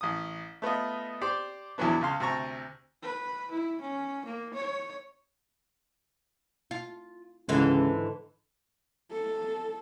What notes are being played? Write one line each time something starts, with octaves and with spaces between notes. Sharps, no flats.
A1 D#6
A3 B3 F4 D#5
G4 C5 D5
E2 A#2 E3 F#3 B3 D4
C#2 C#3 F5 C6
D2 C3 A5 A#5 C#6
B4
E4
C#4
A#3
C#5
F4
C#2 G#2 D3 E3
A4